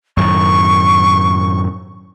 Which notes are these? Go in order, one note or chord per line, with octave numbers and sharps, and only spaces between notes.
F#2 A2 D#3 C#6